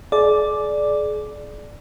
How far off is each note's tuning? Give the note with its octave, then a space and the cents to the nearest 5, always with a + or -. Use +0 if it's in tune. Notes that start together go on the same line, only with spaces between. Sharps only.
G#4 +40 D5 +0